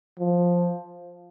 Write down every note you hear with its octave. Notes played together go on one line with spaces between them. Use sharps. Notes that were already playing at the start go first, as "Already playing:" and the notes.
F3